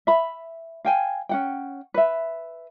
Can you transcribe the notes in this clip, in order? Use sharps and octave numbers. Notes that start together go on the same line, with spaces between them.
E5 B5
F5 G5 G#5
C#4 F#5 G5
B4 E5